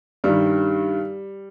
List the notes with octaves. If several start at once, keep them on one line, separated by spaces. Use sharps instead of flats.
G2 D#3 G3